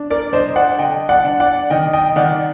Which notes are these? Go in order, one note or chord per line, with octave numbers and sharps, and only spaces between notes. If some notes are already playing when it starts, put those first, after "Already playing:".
Already playing: D4
A#4 D5
D4 C5 D#5
D5 F#5
D3 D#5 G5
D5 F#5
D4
D5 F#5
D#3 D#5 G5
D#5 G5
D#3 D5 F#5